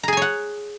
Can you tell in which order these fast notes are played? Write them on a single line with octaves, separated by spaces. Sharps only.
A#5 G#4 G#5 C#5 F#5